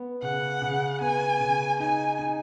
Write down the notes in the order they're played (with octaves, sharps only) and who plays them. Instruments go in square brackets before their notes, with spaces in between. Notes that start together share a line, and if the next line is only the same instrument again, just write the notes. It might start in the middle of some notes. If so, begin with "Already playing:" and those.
Already playing: [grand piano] B3
[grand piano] C#3 [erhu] F#5
[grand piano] C#3
[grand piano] B3 [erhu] G#5
[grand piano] C#3
[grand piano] D#4 [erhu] G#5
[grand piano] D#4